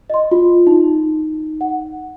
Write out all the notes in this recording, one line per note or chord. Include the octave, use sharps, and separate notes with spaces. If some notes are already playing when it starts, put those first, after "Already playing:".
D#5 C6
F4
D#4
F#5